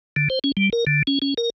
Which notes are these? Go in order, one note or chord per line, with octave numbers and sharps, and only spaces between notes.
D3
C5
C#4
G3
A#4
D3
C#4
C#4
A#4